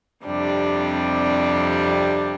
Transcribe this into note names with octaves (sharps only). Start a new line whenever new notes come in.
F2 C3 G3 D4